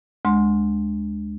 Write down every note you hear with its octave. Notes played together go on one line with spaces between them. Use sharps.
D2 G#3 C6